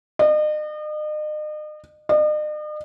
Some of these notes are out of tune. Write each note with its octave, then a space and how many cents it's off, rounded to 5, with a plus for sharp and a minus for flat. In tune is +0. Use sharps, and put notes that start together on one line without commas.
D#5 -40
D#5 -45